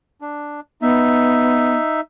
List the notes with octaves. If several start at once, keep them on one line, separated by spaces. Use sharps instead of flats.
D4
B3 D#4 E5